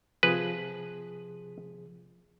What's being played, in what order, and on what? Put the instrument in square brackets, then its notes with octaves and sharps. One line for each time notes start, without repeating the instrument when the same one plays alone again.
[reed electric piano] C3 F3 G#4 [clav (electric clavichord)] B4